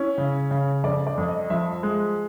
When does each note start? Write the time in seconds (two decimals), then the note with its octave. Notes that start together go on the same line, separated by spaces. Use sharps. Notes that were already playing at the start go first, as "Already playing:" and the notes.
Already playing: C#4 E4
0.18 C#3
0.51 C#3
0.84 F2 D5
1.07 D5
1.18 F2
1.28 D#5
1.50 F3 E5
1.83 G#3